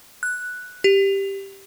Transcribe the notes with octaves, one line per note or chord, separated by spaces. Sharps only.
F#6
G4